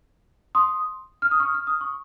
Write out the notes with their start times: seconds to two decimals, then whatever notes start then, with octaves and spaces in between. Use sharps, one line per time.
0.55 C6 D#6
1.22 F6
1.31 D#6
1.40 C#6 F6
1.54 F6
1.67 D#6
1.81 C#6